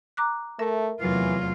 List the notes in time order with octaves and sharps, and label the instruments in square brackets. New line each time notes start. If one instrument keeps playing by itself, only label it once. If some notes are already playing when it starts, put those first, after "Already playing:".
[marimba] A#5 D6 F#6
[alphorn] A3 [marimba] A#4 E5
[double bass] F1 E2 [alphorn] E3 [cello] F#3 F4